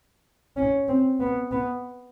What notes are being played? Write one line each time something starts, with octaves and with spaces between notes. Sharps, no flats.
C#4
C4
B3
B3